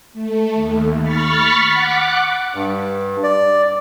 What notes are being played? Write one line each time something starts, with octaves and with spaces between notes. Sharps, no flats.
A3
D#2
B5 C#6 F6 A6 B6 C#7
F#5 D6 F#6
G2
D5